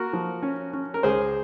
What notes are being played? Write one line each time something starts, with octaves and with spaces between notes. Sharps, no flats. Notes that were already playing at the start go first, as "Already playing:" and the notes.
Already playing: A#3 F#4 A#4
F3
C#4
C#4
A#4
C#2 G#4 C5